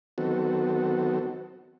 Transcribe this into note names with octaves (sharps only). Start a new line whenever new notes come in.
D#3 F#3 B3 C4 F#4 A4